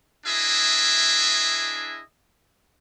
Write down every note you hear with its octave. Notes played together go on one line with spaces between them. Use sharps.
D4 E4 G#4 D#5 E5